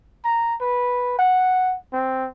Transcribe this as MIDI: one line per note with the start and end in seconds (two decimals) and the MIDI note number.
0.25 0.55 82
0.61 1.16 71
1.19 1.75 78
1.93 2.27 60